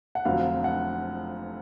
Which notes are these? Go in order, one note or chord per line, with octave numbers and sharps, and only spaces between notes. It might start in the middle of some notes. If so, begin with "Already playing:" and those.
F#5
F1 F2 D3 F#3 F5
F#5